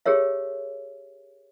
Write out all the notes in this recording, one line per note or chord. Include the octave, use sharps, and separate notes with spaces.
G4 G#4 A#4 C#5 E5